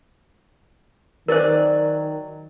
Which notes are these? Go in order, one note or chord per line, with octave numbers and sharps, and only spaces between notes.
D#3 F#3 A#4 C5 D5 G#5